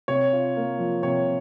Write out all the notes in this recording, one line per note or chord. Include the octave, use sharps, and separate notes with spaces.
C3 C#5
F4
A#3
F3
C3 C#5